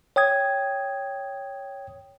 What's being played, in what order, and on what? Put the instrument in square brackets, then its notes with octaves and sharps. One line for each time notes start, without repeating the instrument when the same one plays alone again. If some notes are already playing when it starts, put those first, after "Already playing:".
[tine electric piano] C#5 G5 D#6 G#6